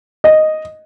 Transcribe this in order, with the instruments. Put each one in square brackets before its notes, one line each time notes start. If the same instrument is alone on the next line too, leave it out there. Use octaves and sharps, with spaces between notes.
[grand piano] D#5